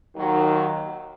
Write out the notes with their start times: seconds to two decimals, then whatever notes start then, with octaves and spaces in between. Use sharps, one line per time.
0.14 D#2 D#3 F#3